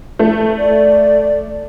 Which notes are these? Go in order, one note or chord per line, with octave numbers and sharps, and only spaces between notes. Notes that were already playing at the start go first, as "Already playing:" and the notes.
A3
D5